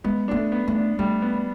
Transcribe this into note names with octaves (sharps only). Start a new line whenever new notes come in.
G#3 B3
A#3 D4
A3
B3
A3
D4
G3 A3
B3